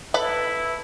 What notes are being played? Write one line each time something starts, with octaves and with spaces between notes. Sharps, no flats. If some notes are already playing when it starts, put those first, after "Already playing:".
E4 A4 B4 B5